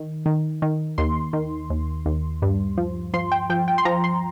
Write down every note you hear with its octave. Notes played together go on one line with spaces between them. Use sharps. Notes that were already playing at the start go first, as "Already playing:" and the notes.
Already playing: D#3
D#3
D#3
D#2 C6
D#3
D#2
D#2
G2
F3
F3 C6
G5
F3 G5
G5
C6
F3 A#5
C6